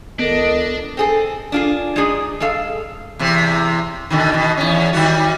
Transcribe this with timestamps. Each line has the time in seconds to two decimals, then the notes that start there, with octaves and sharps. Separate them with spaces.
0.19 C#2 D#3 B3 D4 A4 A#4 D#5
0.97 C4 G#4 A4
1.52 D4 F4 G#4
1.96 G#3 D4 D#4 G#4 D5
2.40 G#3 G#4 A4 F5
3.19 E2 C3
4.10 B2 D3 D#3
4.32 B2 D#3
4.57 E2 C#4
4.93 D#3 G3 F#4